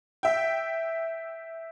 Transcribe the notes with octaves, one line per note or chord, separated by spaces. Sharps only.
E5 G5